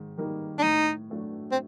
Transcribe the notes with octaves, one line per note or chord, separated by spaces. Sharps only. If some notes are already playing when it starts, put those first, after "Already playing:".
Already playing: G#2 D#3
D#3 G3 A#3 D#4
D4
A2 D#4
F#3 A3 D4 F#4
C4